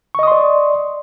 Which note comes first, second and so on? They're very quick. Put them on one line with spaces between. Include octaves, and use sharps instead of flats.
C#6 D#5 D#6 C6 D5